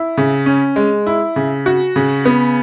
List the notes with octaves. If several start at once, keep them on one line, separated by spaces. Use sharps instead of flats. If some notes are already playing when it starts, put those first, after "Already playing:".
Already playing: E4
C#3
C#4
G#3
E4
C#3
F#4
C#3
B3